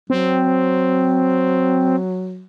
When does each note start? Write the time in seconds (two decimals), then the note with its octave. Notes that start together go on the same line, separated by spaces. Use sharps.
0.10 F#3 C4